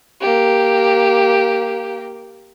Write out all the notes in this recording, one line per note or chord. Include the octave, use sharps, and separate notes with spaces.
A#3 G4